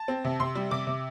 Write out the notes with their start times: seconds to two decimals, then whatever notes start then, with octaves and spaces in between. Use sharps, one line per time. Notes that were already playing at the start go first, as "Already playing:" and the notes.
Already playing: A5
0.08 C4
0.24 C3
0.40 C3 C6
0.55 G3
0.71 C3 D6
0.87 C3